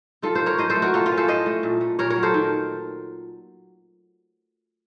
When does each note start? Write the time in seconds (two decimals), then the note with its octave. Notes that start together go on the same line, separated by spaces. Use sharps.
0.22 D#4 F4 A4
0.35 A4 C5
0.40 C4
0.46 A#4 C#5
0.58 A2 C5 D#5
0.70 A4 C5
0.76 A3
0.82 F#4 A#4
0.93 A2 F4 A4
1.06 F4
1.12 C#4
1.17 A4 C5
1.28 A2 C5 D#5
1.46 A3
1.63 A#2
1.81 A3
1.99 A#2 A#4 C#5
2.10 A#4 C#5
2.16 F#3
2.23 A4 C5
2.34 D#3